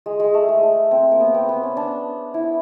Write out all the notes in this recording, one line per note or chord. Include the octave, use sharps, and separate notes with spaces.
G#3
G#3
A3
G#3
A3
C4
A#3
B3
C4
B3
C#4
D4
E4